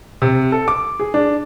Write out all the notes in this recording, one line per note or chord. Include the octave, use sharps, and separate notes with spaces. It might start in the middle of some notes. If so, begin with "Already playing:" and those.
C3
A4
D6
G#4
D4